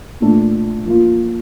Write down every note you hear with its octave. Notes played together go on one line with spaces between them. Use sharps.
A#2 A3 D4
F3 A#3 F4